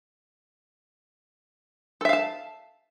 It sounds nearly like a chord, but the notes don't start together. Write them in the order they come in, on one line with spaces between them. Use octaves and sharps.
A4 E5 F5 A5